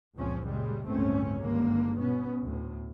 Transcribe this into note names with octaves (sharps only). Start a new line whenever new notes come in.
F#1 C#2 A#2 F3 C4 C#4
A#2 C#3 G3 G#3
G1 C#2 A2 A3 C4 C#4
G#1 G2 D3 A#3
B2 B3 C#4
D2 A2